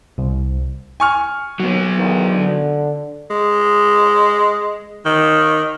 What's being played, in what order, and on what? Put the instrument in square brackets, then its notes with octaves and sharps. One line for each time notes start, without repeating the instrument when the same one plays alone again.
[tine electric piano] C2
[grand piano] G#5 C#6 F6
[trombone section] D#2 [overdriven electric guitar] F#3 B3
[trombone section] E2 G#2 D#3
D3
[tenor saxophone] G#3
D#3